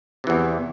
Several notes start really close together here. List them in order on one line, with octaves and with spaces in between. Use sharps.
C3 E3 E2